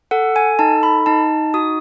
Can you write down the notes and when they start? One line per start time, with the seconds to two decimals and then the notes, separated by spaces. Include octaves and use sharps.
0.11 A4 F#5
0.36 G#5
0.59 D#4 A5
0.83 B5
1.06 D#4 A5
1.54 F#4 D#6